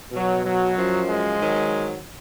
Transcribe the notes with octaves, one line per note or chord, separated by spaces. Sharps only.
B2 F#3
F#3
F#2 F3
G#3
G#2 D#3 F#3